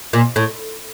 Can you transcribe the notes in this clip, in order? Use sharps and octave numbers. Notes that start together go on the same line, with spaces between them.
A#2
A2